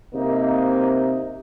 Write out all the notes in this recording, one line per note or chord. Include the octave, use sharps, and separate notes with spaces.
C3 A#3 D#4